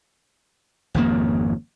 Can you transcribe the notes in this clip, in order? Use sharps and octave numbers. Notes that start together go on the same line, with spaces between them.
G#1 F2 C#3 A#3